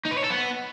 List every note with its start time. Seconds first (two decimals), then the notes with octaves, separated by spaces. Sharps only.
0.05 D#4
0.11 B4
0.17 C#5
0.24 A4
0.30 B3